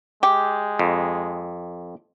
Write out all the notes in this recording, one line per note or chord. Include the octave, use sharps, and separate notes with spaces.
G#3 G4
F2